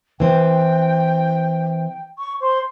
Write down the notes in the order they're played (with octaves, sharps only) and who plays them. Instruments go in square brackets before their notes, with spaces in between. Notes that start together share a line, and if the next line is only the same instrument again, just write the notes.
[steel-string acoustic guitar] E3 C4 [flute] G5
[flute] C#6
C5